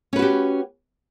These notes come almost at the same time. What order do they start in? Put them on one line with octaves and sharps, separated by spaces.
C#4 B4 F#4 G4